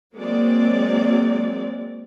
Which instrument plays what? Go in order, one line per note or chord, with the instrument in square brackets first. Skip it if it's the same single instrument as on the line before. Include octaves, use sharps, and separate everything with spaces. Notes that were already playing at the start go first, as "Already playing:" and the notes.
[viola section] F#3 G#3 A#3 C4 D5